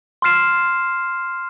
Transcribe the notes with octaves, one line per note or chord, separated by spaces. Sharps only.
C6 F6 C7 E7